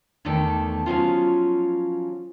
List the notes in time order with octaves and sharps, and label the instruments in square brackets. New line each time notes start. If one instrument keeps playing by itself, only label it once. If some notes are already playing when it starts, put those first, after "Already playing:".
[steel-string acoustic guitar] E2 D3 D#3 A3 A4 G5
F3 F#3 C#4 F4